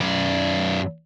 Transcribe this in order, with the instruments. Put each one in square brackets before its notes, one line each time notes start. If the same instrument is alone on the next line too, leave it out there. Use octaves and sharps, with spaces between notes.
[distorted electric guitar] F#2 D5